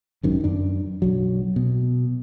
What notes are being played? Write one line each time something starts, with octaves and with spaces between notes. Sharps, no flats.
G#1 F#2 D#3
F#2 D4
B1 F#3
B2